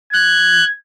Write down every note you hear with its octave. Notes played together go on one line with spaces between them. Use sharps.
F#6 G#6